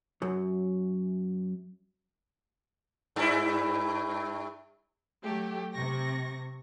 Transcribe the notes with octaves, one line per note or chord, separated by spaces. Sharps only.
F#2 F#3
G2 E4
F#3 A3 G4
C3 C#6 A#6